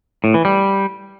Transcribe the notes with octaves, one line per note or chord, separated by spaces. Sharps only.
A2
E3
G3